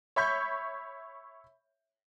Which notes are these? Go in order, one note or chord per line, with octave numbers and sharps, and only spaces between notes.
C#5 E5 B5 C#6 G6